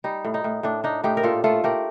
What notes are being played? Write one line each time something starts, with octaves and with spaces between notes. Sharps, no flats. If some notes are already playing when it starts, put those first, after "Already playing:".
G3 D#4
A2
D#4
A2
A2 D4
D4 D#4
A2 D#4 G4
A#4
A#2 F4 A4
A3 F4 A4
A3 G4 A#4